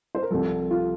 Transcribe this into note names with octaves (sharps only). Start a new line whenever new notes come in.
C5
A#4
C2 C3 F3 A4
F4